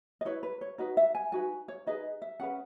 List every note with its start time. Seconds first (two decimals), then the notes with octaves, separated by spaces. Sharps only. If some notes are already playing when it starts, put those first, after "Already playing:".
0.21 D#5
0.25 E4 B4 C#5
0.43 B4
0.61 C#5
0.78 D#4 F#4 B4 D#5
0.97 E5
1.15 G#5
1.32 D#4 F#4 B4 G#5
1.68 C#5
1.87 D#4 G#4 B4 D#5
2.22 E5
2.40 C#4 G#4 B4 F#5